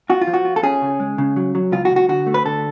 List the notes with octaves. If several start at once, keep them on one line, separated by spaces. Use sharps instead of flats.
F4 F#4
F4
F3
F#4
F4
A4
C#4 G#4
C#3
G#3
C#3
F#3
F#3
C#2 F4
F#4
C#2
F#4
D3 F#4
A3
B4
D3 A4